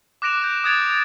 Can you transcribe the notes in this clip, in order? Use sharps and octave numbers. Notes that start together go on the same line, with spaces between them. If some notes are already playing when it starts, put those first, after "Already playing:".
D6 F#6 A#6 D7 E7 F7
F#6 G6
D#6 F#6 G#6 A6 D7 F7